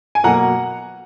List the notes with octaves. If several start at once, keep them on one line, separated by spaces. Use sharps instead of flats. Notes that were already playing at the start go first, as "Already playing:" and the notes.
G#5
B2 F#3 A#3 F#5 A#5